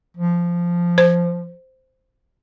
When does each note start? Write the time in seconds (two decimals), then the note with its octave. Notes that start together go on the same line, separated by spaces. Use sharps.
0.17 F3
0.98 C5